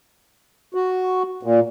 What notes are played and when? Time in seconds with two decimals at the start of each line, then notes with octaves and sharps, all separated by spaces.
0.74 F#4
1.43 A#2